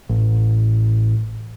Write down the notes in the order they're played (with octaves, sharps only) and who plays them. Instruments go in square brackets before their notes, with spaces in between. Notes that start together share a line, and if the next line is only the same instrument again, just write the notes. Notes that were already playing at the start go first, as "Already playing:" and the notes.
[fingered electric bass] A1